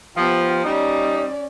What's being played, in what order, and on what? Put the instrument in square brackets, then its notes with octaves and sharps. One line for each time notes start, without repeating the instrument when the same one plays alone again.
[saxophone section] F3 [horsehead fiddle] B3 G4
[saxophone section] G3 D#4 [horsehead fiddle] C#4 D5